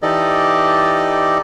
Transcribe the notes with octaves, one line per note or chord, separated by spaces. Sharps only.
E3 D#4 G4 A4 D5 D#5